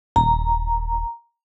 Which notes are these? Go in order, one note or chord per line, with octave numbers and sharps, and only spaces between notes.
D#1 A#5